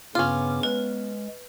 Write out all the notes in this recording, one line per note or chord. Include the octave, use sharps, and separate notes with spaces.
G2 C#3 B3 C#4 F4 D6 F6
G#3 B4